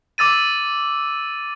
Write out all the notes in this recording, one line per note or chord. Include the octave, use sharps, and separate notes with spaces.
D6 E6 A6 D#7